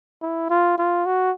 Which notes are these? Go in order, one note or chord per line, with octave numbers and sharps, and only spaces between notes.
E4
F4
F4
F#4